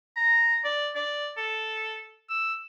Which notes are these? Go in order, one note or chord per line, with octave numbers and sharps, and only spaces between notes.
A#5
D5
D5
A4
E6